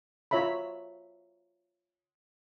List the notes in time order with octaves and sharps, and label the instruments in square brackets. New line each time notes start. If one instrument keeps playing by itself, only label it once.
[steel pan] F4 C#5 E5 A#5 B5